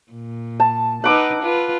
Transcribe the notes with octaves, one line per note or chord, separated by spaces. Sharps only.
A#2
A5
D#4 B4 F#5 D6 E6
F4 B4